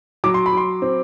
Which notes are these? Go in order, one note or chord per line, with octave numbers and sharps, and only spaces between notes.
F#3 D6
C6
B5
F#3 C6
C4